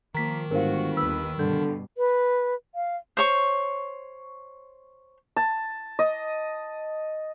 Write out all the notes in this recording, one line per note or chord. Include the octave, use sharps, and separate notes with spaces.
D#3 F3 A#3 A#5 B6
G1 G#2 F#4 A#4 C5 F5
D#2 B4 E6
G2 B2 D3 G3 G6
B4
F5
C5 C#5 C#6
A5
D#5